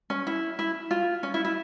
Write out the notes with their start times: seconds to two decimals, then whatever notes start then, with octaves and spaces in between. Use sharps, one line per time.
0.10 C#4
0.27 E4
0.59 E4
0.91 F4
1.23 C#4
1.34 E4
1.44 E4